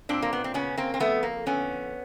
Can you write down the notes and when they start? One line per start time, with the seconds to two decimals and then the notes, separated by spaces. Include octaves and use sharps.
0.09 A#2 C4 D4
0.22 A#3
0.33 B3
0.44 C4
0.54 C#3 B3 C#4
0.77 A#3 C4
0.94 C4
1.00 F2 A3 B3
1.23 A#3
1.46 D3 B3 C#4